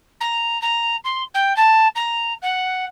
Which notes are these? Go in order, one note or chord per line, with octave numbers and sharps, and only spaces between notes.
A#5
A#5
C6
G5
A5
A#5
F#5